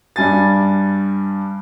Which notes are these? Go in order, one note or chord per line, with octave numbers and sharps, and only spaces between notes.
G2 G3 G#5 A6